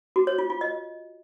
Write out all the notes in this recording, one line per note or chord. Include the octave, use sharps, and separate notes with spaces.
F#4
C#5
F4
F4
D#5